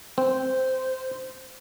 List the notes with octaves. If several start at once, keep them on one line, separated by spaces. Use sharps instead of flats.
C4 C5